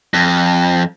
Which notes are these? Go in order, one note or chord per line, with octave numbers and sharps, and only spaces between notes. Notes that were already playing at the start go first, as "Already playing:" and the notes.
F2